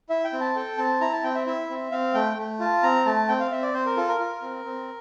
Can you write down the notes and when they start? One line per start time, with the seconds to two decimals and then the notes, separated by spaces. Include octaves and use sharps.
0.10 E4 E5
0.25 G5
0.33 C4
0.40 A5
0.56 A4 G5
0.78 C4 A5
1.01 E4 A#5
1.12 A5
1.24 C4 G5
1.35 E5
1.47 E4 E5
1.70 C4
1.92 C4 F5
2.14 A3 G5
2.37 A3
2.60 F4 A5
2.83 C4 A#5
3.06 A3 A5
3.28 C4 G5
3.40 F5
3.51 C4 E5
3.62 D5
3.74 C4 C5
3.86 A#4
3.97 F4 A4
4.08 A#4
4.20 F4
4.42 C4
4.65 C4